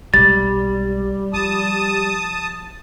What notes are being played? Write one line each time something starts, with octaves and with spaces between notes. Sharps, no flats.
B1 G3 G#3 A6
F3 A5 D#6